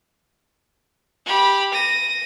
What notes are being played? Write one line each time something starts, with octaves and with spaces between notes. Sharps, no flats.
G4 B5
A#6 D#7